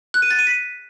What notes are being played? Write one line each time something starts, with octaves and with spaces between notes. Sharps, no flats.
F#6
D#7
A6
D#7
B6